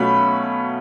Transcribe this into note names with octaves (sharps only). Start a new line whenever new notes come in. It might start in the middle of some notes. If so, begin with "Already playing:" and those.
Already playing: B2 F#3 A3 C#4 F4 B5